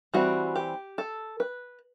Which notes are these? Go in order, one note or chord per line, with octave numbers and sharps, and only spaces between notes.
E3 G3 C4 F#4
G4
A4
B4